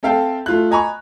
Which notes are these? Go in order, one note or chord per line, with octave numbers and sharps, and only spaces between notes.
C4 A4 E5 F5 G5 A5
A3 F4 F#6
D#5 G#5 A#5 B5 C#6